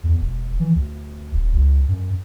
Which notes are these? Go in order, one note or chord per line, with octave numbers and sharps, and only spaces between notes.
E2
E1
E3
D2
D#1
C#2
F#2